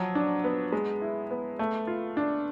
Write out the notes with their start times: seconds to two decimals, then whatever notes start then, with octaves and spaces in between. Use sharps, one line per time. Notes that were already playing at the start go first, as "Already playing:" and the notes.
Already playing: F3 F#3
0.15 D4
0.44 B3
0.72 G#3
1.02 E4
1.31 B3
1.59 A3
1.87 F4
2.17 D4